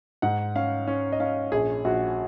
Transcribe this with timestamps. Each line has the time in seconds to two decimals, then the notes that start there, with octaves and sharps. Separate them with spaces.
0.22 G#2 F#5
0.55 C#4 F5
0.87 C#4
1.12 D#5
1.20 C#4 F5
1.52 A#1 G#4
1.85 A#1 F#4